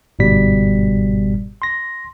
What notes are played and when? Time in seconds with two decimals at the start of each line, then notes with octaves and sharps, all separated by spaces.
0.19 G1 G#2 B2 G3 B6
1.62 C6 A#6